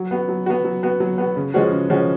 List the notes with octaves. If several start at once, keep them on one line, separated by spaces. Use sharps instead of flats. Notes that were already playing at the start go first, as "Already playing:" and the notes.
Already playing: F#3
B3 F#4
F#3
B3 F#4
F#3
B3 F#4
F#3
B3 F#4
C#3
F3 G#3 C#4 F#4
C#3
F3 G#3 C#4 F#4